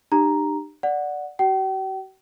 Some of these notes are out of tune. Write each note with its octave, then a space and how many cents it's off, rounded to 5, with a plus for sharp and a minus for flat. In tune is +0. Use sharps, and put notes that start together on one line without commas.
D#4 -45 G4 +0 A#5 +0
D5 +0 F#5 -5
F#4 +40 G5 -40